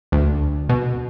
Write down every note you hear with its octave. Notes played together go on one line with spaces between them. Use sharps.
D2
B2